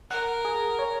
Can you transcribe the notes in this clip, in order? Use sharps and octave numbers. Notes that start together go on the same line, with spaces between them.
A#4 F#5
G#4
C#5